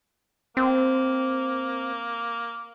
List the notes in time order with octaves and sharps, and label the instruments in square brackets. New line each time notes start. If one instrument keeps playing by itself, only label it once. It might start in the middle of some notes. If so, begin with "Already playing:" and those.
[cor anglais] A#3 [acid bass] C4